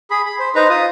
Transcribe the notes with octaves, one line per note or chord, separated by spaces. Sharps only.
G#4 B5
B5
C5
D#4 B4 C5 A#5
F4 D#6